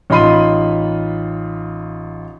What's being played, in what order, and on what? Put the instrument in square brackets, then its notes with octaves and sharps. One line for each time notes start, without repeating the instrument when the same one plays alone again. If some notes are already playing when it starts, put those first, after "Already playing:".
[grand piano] A1 D#4 F4 B5 C6 D#7